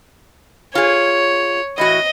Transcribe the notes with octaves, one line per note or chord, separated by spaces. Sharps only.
F4 G#4 C#5
A2 E3 F#4 D#5